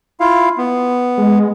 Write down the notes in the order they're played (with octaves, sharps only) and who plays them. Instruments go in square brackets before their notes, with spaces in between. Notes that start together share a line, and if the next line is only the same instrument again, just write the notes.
[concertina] E4 F4 F5
B3
[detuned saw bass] G#3